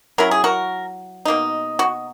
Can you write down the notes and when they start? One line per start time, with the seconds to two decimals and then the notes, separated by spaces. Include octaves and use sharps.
0.18 F#3 C#4 E4 A#4
0.31 G#4
0.44 F#4 A#4
1.25 B2 A#3 D#4
1.79 F#4